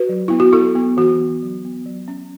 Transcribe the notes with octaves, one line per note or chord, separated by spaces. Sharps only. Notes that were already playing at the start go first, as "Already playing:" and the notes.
Already playing: F#4 B4
F#3
B3 E4
F#4
F#3 E4 A4
B3
E3 F#4
B3
F#3
B3
F#3
C#4